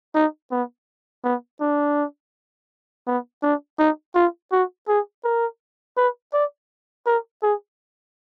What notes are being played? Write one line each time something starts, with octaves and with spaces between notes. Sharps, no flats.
D#4
B3
B3
D4
B3
D4
D#4
F4
F#4
G#4
A#4
B4
D5
A#4
G#4